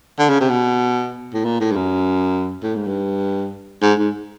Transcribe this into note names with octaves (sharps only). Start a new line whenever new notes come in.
D3
C#3
C3
B2
A2
A#2
A2
G2
F#2
A2
G#2
G2
G#2
G#2